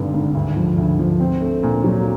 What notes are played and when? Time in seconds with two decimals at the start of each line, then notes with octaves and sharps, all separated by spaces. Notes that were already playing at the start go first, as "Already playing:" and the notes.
Already playing: G#1 G2 D3
0.13 G#1
0.34 D2
0.56 F3
0.78 D2
0.99 F3
1.20 C4
1.41 A3
1.63 A#2
1.84 F#3